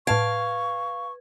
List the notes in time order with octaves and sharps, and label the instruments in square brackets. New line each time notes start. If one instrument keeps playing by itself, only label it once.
[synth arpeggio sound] A2 A5 D7 [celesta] B4 G#6 [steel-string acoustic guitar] F5 [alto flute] C#6